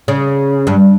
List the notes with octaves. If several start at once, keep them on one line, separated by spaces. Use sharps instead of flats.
C#3
G2